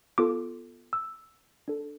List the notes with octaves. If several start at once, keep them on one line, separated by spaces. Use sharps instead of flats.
B3 F4 A4 D6
E6
D4 A4